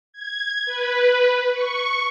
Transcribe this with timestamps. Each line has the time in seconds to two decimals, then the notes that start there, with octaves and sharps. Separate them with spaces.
0.13 G#6
0.66 B4
1.52 C#6